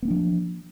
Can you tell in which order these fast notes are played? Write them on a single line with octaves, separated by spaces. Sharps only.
B3 A#3 D4 F3